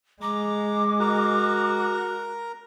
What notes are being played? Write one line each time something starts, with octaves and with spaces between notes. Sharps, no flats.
G#3 A#5 D6
F#4 A#4 A#5